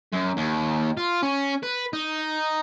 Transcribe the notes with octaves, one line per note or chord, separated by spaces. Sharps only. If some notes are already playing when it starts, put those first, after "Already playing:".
F#2
D#2
F4
C#4
B4
D#4